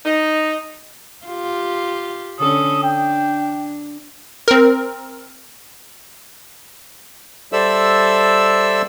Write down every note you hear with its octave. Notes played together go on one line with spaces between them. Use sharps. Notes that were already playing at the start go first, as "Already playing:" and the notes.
D#4
F4 G4
D3 C#4 A4 D#6
D4 G5
C4 A#4
G3 A4 C5 D5 E5 E6